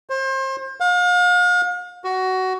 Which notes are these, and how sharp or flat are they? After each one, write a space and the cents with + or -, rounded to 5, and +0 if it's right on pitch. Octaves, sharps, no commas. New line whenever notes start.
C5 +30
F5 +40
F#4 +15